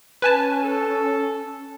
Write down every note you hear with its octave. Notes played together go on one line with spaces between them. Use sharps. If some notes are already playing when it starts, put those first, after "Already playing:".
C#4 B4 G#5 A5
A4